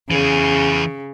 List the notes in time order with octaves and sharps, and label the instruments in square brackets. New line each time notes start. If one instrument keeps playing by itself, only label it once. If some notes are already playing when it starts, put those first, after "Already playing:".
[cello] C#3 [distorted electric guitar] E3 G#4